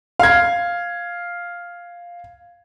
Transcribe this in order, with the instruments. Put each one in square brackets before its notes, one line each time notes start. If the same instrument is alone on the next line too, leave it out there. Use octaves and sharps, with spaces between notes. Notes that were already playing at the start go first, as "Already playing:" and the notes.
[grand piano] F5 G#6